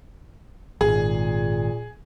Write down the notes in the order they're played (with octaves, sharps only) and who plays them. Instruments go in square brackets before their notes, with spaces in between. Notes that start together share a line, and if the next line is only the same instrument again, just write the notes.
[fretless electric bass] G#1 [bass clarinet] A#2 [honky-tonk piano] G#4